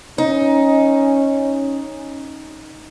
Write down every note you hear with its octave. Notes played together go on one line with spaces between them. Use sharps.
C#4 D#4